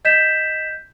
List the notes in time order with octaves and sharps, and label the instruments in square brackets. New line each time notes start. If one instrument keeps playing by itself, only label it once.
[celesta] D#5 G6 B6 E7